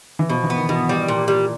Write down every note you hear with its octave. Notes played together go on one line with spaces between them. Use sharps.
E3
B2 F3
E3
B3
D#3
B2 E3
G3
A#2
G3